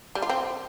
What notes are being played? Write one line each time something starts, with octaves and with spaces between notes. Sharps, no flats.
G3
F4
C4